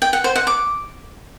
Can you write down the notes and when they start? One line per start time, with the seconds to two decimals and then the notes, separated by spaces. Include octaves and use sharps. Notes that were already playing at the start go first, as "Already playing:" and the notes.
0.02 G5
0.13 F#5
0.24 C5
0.36 F#5
0.47 D6